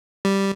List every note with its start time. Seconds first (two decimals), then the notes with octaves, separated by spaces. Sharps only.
0.25 G3